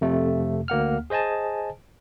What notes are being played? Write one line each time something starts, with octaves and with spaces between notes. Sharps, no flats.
F2 C3 A3
D2 A#3 F#5 F6
G#4 C5 D#5 G#5 A5